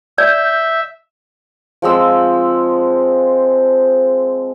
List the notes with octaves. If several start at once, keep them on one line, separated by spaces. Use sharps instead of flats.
D5 E5 G6
F3 G#3 C4 E6